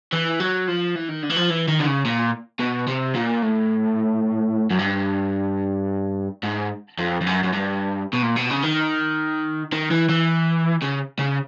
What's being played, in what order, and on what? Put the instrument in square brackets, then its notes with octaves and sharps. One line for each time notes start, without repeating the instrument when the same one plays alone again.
[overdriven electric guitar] E3
F#3
F3
E3
D#3
D3
E3
F3
E3
D#3
D3
C#3
A#2
B2
C3
A#2
A2
F#2
G2
G#2
F2
F2
F#2
F#2
G2
B2
A#2
B2
C#3
D#3
D#3
E3
E3
C#3
C#3